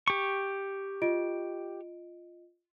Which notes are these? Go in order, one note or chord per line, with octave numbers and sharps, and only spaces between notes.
G4 C#6
F4 D#5 D7